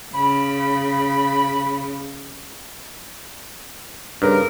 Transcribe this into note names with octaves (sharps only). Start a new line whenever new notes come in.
C#3 B5
G2 C#3 A#4